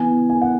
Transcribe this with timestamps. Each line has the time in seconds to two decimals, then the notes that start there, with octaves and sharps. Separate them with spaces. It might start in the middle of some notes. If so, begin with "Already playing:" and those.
Already playing: E3 B3 G#5
0.30 G#5
0.42 F#5